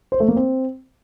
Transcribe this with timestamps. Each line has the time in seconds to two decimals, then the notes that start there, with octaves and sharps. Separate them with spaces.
0.12 C5
0.20 A3
0.28 A#3
0.36 C4